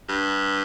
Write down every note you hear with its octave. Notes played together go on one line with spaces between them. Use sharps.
G2